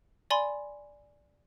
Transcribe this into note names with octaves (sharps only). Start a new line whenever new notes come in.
D5 G#5 B5 C6